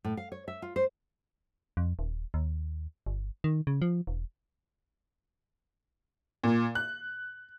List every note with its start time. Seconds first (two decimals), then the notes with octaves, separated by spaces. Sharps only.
0.04 A2
0.17 F5
0.32 C#5
0.48 E5
0.62 F4
0.76 C5
1.77 F2
1.99 D#1
2.34 D#2
3.06 G1
3.44 D#3
3.67 C#3
3.82 F3
4.07 E1
6.44 A#2
6.75 F#6